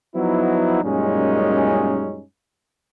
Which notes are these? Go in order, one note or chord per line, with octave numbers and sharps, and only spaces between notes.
F3 F#3 B3 D#4 E4
F#2 A#2 G3 G#3 C#4 D#4